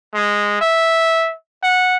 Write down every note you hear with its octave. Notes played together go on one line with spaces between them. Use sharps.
G#3
E5
F#5